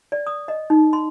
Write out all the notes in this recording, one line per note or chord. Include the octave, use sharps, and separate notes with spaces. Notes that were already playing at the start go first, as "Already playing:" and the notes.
D5
D#6
D#5
D#4
C6